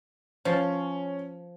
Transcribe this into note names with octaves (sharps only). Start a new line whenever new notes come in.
F3 C#4